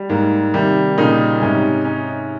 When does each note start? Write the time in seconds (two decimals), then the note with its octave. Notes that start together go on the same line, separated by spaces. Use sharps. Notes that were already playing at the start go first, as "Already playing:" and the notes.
Already playing: G3
0.09 G#2 A#3
0.54 C3 D#3 G3
0.98 A#2 C#3 D#4
1.42 G#2 C3 C#4
1.85 C#4